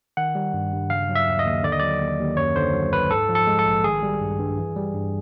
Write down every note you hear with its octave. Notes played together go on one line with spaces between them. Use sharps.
D#3 F#5
G3
G2
G2
C#3 F5
F#3
E5
D#2
D#5
D#2
D3 D5
D#5
F#3 D5
D#2
D#2
F#2 C#5
D3 C5
F#3
G1 B4
G#2 A4
F3
A4
G#3
A4
A#1
D#3 G#4
G3
G2
G2
E3
G3
G2